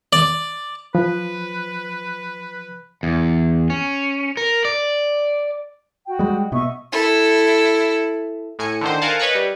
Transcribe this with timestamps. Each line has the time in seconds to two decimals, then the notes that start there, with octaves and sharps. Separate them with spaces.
0.13 D5
0.95 F3 B4
3.03 E2
3.70 C#4
4.37 A#4
4.65 D5
6.06 F#4 G5
6.19 G3 G#3
6.52 B2 A#3 B3 D#5 E5 C#6
6.92 E4 A4
8.59 A2 G#5 C#7
8.81 D3 D#3 C5
9.02 A#4 F5 F#5 G#5 A5
9.19 B4 C#5 D#5 B5 C#6
9.35 G3